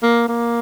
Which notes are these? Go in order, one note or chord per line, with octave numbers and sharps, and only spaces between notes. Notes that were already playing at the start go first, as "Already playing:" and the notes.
A#3
A#3